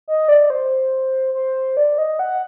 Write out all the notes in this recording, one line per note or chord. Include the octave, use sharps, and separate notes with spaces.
D#5
D5
C5
C5
D5
D#5
F#5